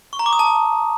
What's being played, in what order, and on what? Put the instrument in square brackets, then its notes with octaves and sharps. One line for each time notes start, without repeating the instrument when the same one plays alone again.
[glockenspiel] C#6
A#5
D6
D#6
A5